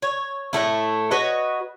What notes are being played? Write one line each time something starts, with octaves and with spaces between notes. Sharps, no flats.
C#5
A2 C3 A3 E4
F#4 B4 C#5 D#5